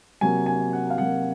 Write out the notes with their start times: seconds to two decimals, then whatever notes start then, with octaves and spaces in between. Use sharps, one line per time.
0.21 C3 F#3 A#3 G#5
0.46 G#5
0.73 F#5
0.90 F5
0.98 C3 F#3 A#3 F#5